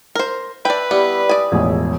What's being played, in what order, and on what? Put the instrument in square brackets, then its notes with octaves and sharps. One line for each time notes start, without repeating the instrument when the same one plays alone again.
[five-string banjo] A#4 C5
[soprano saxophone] B4 [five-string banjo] D5 G5 [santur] E5 A5
[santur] G3 E4 [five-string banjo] B3 [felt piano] G4
[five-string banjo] D5 G#5 [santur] D#6
[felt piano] E1 A1 F3 [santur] G#4 E5